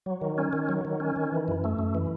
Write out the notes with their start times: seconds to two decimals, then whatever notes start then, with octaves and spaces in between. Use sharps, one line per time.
0.06 F#3
0.21 D#3
0.38 C#4
0.53 D#3
0.69 F#3
0.85 D#3
1.00 C#4
1.16 D#3
1.32 E3
1.48 F#2
1.64 A3
1.79 F#2
1.95 E3